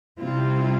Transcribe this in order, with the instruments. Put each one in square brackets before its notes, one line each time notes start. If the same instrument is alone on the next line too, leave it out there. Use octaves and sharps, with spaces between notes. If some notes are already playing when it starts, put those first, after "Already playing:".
[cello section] C3 G3 C4 E4 F4